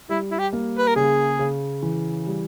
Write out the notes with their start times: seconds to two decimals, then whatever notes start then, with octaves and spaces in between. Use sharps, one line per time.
0.09 G3 E4
0.31 E4
0.38 G4
0.53 A#3
0.78 B4
0.87 A#4
0.96 C#3 G#4
1.39 C#3
1.82 E3
2.26 G3